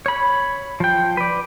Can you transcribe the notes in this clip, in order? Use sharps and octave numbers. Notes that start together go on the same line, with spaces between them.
C#5 B5
F3 G5
B4 D5